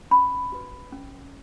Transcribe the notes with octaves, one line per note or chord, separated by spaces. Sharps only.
C#4 B5
F#4 B4
C#4